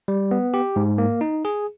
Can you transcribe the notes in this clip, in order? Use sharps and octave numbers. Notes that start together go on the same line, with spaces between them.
G3
B3
G4
G#2
A#3
D#4
G#4